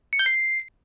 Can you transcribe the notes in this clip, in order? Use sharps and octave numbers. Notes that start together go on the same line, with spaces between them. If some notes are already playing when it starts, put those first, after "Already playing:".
C#7
G6
C7